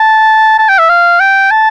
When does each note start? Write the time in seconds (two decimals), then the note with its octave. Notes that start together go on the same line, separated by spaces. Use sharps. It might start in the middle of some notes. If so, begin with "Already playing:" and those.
Already playing: A5
0.59 A5
0.69 G5
0.79 E5
0.89 F5
1.20 G5
1.51 A5